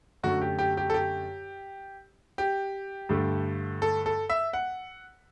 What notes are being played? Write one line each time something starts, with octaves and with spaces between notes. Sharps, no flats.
F#2 D3 A3 F#4
G4
G4
G4
A4
G4
G4
G2 D3 A3
A4
A4
E5
F#5